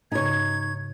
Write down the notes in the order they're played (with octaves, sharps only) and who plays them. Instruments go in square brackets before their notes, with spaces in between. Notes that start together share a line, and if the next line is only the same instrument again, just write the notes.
[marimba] G#2 C#3 [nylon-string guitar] D#4 C#5 [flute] G#6